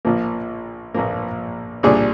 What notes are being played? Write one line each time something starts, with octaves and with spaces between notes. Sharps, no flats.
A#1 A#2 F3 A#3
A#1 A#2 F3 A#3
C2 A#2 G3 D4 G#4